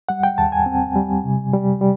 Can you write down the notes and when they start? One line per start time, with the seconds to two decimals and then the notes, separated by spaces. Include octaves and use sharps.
0.09 G3 F#5
0.23 G5
0.38 D#2 A5
0.52 G#5
0.66 C4
0.96 G3
1.24 C3
1.53 G3
1.81 G3